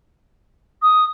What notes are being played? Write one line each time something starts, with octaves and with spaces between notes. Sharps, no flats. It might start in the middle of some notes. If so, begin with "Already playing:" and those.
D#6